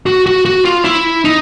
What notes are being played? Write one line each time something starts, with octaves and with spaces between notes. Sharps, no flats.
F#4
F#4
F#4
F4
E4
D#4